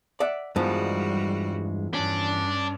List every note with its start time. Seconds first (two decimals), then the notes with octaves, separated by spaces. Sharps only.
0.20 D5 E5 F#5
0.56 E2 G2 D#3 F3 G3 G#3 F#4
1.94 G2 C#4 D4